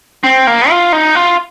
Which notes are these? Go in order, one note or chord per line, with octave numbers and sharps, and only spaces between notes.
C4
A#3
F4
D#4
F4